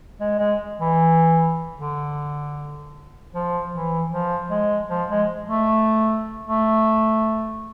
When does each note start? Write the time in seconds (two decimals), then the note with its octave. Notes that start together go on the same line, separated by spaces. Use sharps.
0.21 G#3
0.39 G#3
0.80 E3
1.77 D3
3.34 F3
3.73 E3
4.11 F3
4.50 G#3
4.89 F3
5.10 G#3
5.48 A3
6.47 A3